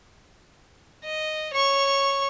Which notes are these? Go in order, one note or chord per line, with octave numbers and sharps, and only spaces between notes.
D#5
C#5 C#6